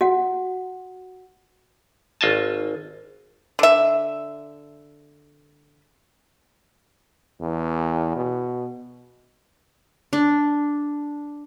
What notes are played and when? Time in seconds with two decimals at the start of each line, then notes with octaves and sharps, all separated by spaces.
0.01 F#4 F#5
2.21 G#1 F4 D#5 G#5 A5
3.59 D3 E5
7.40 E2
8.16 B2
10.13 D4